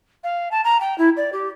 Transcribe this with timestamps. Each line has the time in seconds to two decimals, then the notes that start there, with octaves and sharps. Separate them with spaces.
0.23 F5
0.51 A5
0.64 A#5
0.80 G5
0.98 E4
1.16 D5
1.32 G4